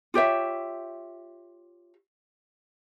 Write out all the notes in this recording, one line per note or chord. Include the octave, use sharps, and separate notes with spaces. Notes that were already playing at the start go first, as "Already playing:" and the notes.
F4 G4 C#5 E5